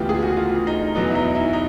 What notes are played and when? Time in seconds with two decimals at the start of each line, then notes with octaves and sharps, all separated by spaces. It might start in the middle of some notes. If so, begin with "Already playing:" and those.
Already playing: D2 C#3 E3 G#3 B3 F4 G4
0.09 G#4
0.22 F#4
0.37 F4
0.67 D#4
0.95 E2 B2 F#3 B3 D#4
1.10 E4
1.15 D#4
1.35 E4
1.53 D#4